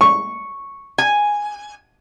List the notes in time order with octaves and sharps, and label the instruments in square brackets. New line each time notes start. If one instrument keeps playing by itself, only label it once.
[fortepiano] C#6
[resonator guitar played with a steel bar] G#5